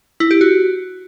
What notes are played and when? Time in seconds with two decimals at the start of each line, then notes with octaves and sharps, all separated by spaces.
0.20 E4
0.31 G4
0.41 F#4